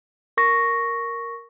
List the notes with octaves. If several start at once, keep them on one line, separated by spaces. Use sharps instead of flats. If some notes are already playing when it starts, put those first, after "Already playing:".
A#4 C#6 A#6